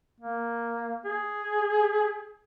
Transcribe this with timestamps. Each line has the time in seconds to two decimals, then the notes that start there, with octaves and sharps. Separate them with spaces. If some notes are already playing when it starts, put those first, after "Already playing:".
0.20 A#3
1.05 G#4